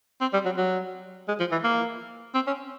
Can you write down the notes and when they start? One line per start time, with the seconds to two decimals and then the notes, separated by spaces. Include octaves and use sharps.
0.21 C4
0.33 G3
0.45 F#3
0.57 F#3
1.28 G#3
1.40 F3
1.51 E3
1.64 A#3
2.34 C4
2.47 C#4